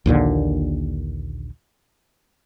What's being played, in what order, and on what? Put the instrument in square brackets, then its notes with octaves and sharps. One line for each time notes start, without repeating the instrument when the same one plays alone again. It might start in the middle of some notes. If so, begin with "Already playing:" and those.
[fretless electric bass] A#1 D#2 A#2 D3